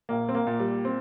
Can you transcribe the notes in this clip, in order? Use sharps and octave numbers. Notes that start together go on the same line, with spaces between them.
A#1 A#3
C4
A#3
A#2
G3
C4